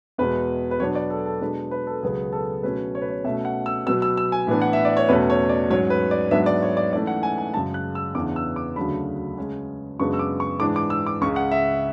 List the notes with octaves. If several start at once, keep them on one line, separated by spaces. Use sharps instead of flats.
E2 B2 G#3 B4
B4
B2 F#3 B3 D4 C#5
D5
A4
A4
B2 G#3 D4 B4
B4
A4
C#2 B2 F#3 B3 G#4
A4
B2 F#3 A3 C#4 B4
C#5
B4
C#5
B2 A3 C#4 E5
F#5
E6
B2 F#3 B3 E6
E6
E6
G#5
A2 E3 B3 D4
F#5
E5
D5
C#5
E2 B2 A3 C#4 B4
C#5
D5
G#2 F#3 C#4 C#5
B4
D5
G#2 F#3 B3 D4 E5
D5
C#5
D5
G#2 E3 A3 C#4 D5
F#5
G#5
G#5
F#2 C#3 G#3 A5
F#6
E6
E2 C#3 E3 B3 D4 D6
E6
D6
D2 C#3 F#3 A3 D4 B5
C#3 G#3 C#4
F#2 C#3 G#3 B3 D4 C#6
E6
D6
C#6
G#2 E3 G#3 D4 D6
D6
E6
D6
C#2 C#3 G#3 C#6
F#5
E5